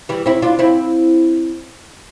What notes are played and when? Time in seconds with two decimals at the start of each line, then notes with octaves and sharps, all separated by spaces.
0.09 E3 G3
0.26 C4 E4
0.42 D4 F4
0.59 C4 E4